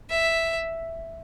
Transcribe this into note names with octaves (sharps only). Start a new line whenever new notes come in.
E5